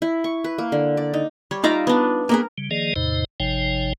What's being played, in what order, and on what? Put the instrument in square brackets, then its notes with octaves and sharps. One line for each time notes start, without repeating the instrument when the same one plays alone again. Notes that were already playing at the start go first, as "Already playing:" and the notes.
[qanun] E4
C#6
B4
A#3
D3
D5
D#4
G3 C#5
[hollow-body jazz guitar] D#4 F4 F5 [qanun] D5 E5 A#5
[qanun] B3 D4
[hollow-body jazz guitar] A#3 B3 G#4 [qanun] A#4
[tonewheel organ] C#3 G3
D#3 F3 A#3 G#4 D5 D#5
E2 A2 C3 D#4 C5 D#5
G#1 C3 F3 D#4 C#5 G5